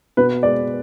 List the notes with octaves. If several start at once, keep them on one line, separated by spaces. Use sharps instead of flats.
B2 B4
G#3 D5